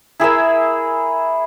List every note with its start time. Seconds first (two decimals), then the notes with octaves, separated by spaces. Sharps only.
0.20 E4 G#4 A#4 E5